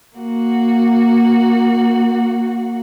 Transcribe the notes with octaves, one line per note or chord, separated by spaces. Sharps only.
A#3 F#4